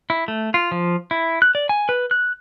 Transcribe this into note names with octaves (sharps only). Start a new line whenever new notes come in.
E4
A3
F4
F3
E4
F#6
D5
G#5
B4
F#6